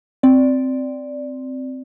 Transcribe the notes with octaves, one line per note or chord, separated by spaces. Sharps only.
C4 D5